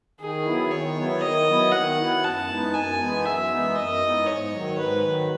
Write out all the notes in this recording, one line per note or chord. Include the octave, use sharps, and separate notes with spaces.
D#3 G#4
F#3 B3 E4
D#3 C#5
F#3 B3 E4
D#3 D#5
F#3 B3 E4
D#3 F#5
F#3 B3 E4
F#2 A5
E3 G#3 B3 D#4
F#2 G#5
E3 G#3 B3 D#4
F#2 E5
E3 G#3 B3 D#4
F#2 D#5
E3 G#3 B3 D#4
G#2 C#5
D#3 F#3
G#2 B4
D#3 F#3